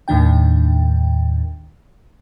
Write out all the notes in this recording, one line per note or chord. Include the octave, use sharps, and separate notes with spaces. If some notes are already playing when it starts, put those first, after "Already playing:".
D#2 A2 D#3 D4 G5